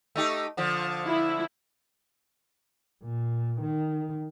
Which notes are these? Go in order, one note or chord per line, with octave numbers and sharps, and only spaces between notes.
A3 D#4 G4
D3 F3
E4
A#2
D#3